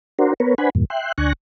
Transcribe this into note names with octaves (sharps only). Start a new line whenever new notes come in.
D4 F#4 A#4 C5
B3 A#4 B4 C#5
D4 B4 C5 F#5 G#5 B5
E2 G2 A#2
E5 G5 C6 F#6
D2 D4 G#5 C#6 F#6 A#6